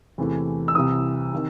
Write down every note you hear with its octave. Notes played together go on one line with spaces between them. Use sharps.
E2 C3 E3 A3
E6
C2 C3 E3 D#6
C3 D#3